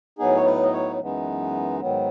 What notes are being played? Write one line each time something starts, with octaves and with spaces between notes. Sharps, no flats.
A2 F#3 B3 D#4 G#4
C#5
B4
D#5
C#5
F#2 E3 G#3 B3 D#4
G#2 D#3 F#3 B3